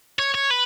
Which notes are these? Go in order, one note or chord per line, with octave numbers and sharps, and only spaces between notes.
C#5
C#5
B4